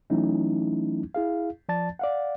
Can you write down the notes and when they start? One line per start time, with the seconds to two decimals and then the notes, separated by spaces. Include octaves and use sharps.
0.10 E3 F#3 A3 C#4 D#4 E4
1.15 E4 G#4 F5
1.69 F3 D5 A5 A6
1.99 D5 F5 F#5